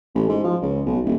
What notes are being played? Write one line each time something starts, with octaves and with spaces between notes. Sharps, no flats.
A1
G#2
F3
C#2
B1
D#1